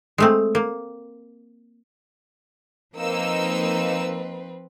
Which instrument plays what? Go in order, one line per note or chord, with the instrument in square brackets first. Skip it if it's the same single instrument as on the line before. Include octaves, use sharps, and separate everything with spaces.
[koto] G#3 A3 C4
A#3
[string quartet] F3 C4 B4 [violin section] A#3 D#4 E6